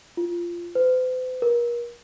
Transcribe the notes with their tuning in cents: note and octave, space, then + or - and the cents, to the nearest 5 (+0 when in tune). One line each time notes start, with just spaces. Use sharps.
F4 -15
C5 -45
A#4 +35